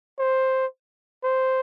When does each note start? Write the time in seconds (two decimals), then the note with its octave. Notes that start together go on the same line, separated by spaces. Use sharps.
0.19 C5
1.24 C5